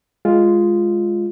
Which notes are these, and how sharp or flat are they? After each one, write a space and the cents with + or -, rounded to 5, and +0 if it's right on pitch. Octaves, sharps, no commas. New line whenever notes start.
G#3 +0 F4 +0